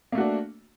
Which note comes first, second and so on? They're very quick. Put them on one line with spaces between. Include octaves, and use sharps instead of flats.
A#3 A3 F#4 D4